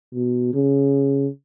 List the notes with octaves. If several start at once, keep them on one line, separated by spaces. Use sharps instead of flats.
B2
C#3